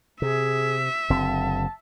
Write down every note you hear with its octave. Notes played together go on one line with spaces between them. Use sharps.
C3 G#4 E5
F#1 D3 C4 A5